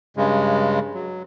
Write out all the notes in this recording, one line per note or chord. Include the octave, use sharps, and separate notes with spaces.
G2 C#3 G#3
F#3